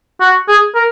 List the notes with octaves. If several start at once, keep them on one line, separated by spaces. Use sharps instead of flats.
F#4
G#4
A#4